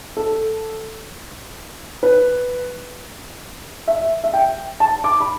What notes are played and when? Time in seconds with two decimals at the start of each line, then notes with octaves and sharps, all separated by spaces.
0.17 A4
2.03 B4
3.88 E5
4.24 E5
4.33 G5
4.80 A5
5.04 D6
5.20 B5